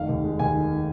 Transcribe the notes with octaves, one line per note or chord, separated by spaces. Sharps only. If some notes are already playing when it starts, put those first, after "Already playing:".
Already playing: F1 D#3 F5
D#2
G#3
D#2 G#5
D#3